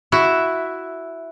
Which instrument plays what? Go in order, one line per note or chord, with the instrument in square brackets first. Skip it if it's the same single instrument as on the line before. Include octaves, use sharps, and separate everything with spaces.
[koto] E4 F#4 E5